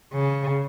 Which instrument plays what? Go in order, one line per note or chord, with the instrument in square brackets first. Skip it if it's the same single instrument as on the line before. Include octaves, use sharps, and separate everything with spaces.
[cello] C#3